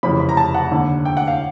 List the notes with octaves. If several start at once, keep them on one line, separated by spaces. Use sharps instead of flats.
F1 F2 C#3 E3 B5
B5
A#5
A5
F#5
D#2 D3
G5
F#5
F5